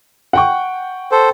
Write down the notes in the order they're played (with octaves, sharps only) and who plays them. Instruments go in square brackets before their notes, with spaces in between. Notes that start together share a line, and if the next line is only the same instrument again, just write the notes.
[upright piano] F#5 G5 C#6
[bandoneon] A4 C5